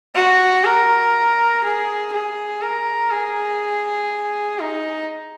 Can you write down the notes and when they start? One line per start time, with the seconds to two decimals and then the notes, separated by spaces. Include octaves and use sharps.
0.15 F#4
0.64 A#4
1.63 G#4
2.12 G#4
2.62 A#4
3.11 G#4
4.59 D#4